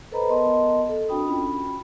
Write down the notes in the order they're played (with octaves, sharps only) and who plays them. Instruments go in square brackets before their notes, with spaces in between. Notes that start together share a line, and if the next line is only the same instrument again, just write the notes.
[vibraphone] A4 B4 C5 D#5 A#5 B5
B3 A#4 D#5 A5 C6
A4
C4 D4 F#4 G5 B5 D#6
C#4 F4 B5